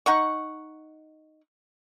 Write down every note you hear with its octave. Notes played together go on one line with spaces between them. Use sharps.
D#4 F#5 C#6